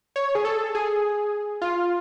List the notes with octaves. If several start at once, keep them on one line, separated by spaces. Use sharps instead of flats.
C#5
G#4
A4
G#4
F4